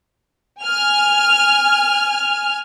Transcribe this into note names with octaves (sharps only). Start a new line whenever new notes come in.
G#5 F6